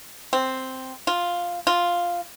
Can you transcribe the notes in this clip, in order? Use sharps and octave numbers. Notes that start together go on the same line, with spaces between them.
C4
F4
F4